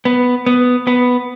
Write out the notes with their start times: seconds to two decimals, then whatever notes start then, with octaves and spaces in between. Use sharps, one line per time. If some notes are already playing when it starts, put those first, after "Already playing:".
0.05 B3
0.46 B3
0.87 B3